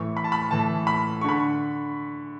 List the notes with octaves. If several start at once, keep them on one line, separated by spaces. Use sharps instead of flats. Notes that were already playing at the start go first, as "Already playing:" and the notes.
Already playing: A2 E3 C#6
B5
A5
B5
A2 E3 A5
B5
C#6
D3 B5